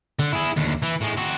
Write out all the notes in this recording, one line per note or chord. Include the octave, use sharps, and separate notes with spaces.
D3
E4 G#4
D#2 D3
E3
A2 G#3
C4 F#4